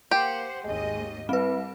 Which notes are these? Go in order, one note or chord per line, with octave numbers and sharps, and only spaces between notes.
A#3 G4 C5 F#5
G#1 D#2 G#3 D#5
G3 C4 E4 B4